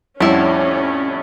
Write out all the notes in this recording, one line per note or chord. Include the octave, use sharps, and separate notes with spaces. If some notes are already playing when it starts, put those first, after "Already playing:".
F2 A2 D3 G3 C#4 E4